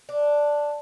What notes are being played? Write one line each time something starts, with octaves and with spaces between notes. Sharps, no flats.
D4